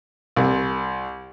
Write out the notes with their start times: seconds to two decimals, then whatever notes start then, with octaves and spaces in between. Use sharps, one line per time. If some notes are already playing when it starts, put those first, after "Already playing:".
0.36 C2